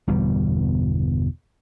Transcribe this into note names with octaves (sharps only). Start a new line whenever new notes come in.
G1 E2 B2 G3